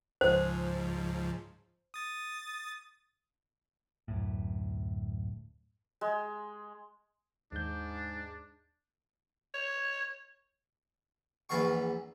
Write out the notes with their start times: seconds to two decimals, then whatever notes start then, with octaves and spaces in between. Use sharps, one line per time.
0.21 C#2 G#2 F3 C5
1.94 D#6 A6
4.08 D1 F#2 A2
6.01 G#3
7.52 D#2 G#2 D4 G6
9.54 C#5
11.49 A#1 E2 E3 F4 F5 C#6